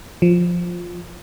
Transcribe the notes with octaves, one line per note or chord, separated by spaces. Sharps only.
F3